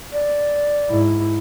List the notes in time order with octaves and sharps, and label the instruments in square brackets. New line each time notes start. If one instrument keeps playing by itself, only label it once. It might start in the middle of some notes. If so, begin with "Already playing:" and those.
[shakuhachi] D5
[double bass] G#2 E4